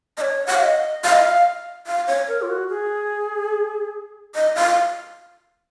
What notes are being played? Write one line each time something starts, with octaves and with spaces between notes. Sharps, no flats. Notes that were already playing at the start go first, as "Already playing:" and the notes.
D#5
C#5
F#5
F5
D#5
F5
D#5
F5
F5
C#5
A#4
F4
F#4
G#4
D#5
F5